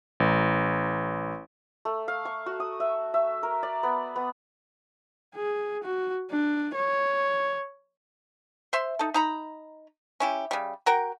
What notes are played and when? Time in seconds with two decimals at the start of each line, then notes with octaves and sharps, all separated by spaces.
0.20 A1
1.85 A3
2.08 F5
2.25 C#6
2.46 F#4
2.60 D#6
2.80 E5
3.14 E5
3.43 A#4
3.63 D5
3.83 B3
4.16 B3
5.35 G#4
5.84 F#4
6.31 D4
6.74 C#5
8.73 C5 E5 C6
8.99 D#4 A4
9.14 D#4 A#5 B5
10.20 C#4 E4 G4
10.51 C#3 G3
10.86 F#4 A#4 F#5 G5